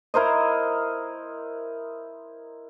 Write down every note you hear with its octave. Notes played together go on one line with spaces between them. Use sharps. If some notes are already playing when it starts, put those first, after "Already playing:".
E4 A#4 C5 D#5